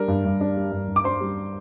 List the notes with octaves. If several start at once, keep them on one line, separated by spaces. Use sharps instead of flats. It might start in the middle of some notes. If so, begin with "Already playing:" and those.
Already playing: G3 D4 A#4
G2
G2
D4
G3
G2
G2
D6
D4 C5 C6
G3